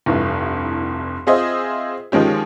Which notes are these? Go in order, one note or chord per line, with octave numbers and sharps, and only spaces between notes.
F1 C2 G2 E3
C4 F4 G#4 C5 D#5 E5
D#3 F3 G#3 C#4 G4